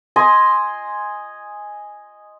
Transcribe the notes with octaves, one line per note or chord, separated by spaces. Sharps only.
D#5 G#5 C6